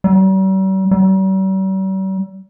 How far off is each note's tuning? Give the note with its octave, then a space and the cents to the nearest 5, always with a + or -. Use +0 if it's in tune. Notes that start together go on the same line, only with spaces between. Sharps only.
G3 -45
G3 -45